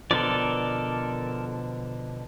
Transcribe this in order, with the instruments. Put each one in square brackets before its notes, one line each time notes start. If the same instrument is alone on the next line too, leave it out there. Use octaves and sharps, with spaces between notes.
[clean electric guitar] B2 D3 F3 [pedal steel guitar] A4 A#4 D5